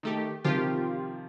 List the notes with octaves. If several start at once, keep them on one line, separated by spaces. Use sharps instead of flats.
D#3 A3 G4
C3 D#3 F3 F4 G4